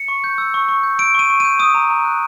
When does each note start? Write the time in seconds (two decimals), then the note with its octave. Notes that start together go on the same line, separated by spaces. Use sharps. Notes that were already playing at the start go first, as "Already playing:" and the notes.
Already playing: C#7
0.08 C#6
0.24 G6
0.38 E6
0.54 C#6
0.69 C#6
0.83 G6
0.99 E6 D7
1.14 C#6 D#7
1.30 C#6
1.40 G6 D#7
1.59 D#6 D#7
1.74 A#5
1.90 A#5
2.05 F#6